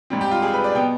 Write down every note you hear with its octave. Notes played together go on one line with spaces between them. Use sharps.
G#2 G3 C4
G4
F4
G#4
B4
D5
B2 B3 G5